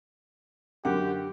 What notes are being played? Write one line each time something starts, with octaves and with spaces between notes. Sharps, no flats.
F#2 D3 G4 F#5